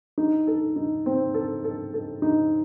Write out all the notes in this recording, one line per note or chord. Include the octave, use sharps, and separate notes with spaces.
D#4
A4
D#4
C4
A4
A4
A4
D#4